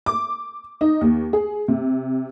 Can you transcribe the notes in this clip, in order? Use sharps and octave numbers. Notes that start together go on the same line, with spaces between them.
D6
D#4
D#2
G#4
C3